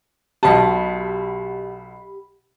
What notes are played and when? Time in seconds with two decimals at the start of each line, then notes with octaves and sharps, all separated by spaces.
0.43 B1 B2 G4 A5 B5